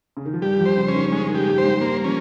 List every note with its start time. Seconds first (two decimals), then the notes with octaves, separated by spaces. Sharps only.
0.17 C#3
0.26 D#3
0.33 F3
0.41 G2 G3 G4
0.59 F2 F3
0.66 C5
0.77 C#3
0.88 C#4
0.95 D#3
1.12 C#3 G#3
1.29 D#3
1.35 G4
1.47 G2 G3
1.58 C5
1.64 G#2 G#3
1.81 G2 G3 A#3
2.04 F3 C#4